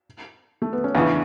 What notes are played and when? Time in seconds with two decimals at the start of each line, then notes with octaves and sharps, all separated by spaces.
0.62 A3
0.73 B3
0.84 C#4
0.95 E2 C#3 E3 B3 D4